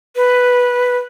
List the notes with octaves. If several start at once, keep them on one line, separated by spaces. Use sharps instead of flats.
B4